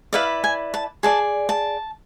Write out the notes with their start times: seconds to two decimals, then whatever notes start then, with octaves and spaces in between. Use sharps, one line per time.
0.13 E4 B4 D5 F5
0.44 G#5
0.74 A5
1.03 G#4 D5 A5
1.49 A5